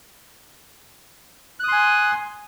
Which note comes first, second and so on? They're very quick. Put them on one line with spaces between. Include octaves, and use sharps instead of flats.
F#6 D#6 C6 G#5